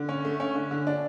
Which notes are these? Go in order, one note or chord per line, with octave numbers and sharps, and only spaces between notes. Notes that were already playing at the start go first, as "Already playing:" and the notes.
Already playing: D3
C#4
A3
C#4
D3
D3
D4